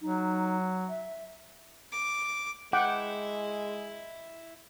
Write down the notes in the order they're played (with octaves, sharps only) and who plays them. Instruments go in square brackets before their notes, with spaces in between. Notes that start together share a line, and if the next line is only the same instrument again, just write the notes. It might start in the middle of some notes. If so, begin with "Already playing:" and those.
[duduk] F#3 [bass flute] D#4
[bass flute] E5
[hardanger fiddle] D6
[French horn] G#3 [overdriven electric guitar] E4 [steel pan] F#5 G5 D6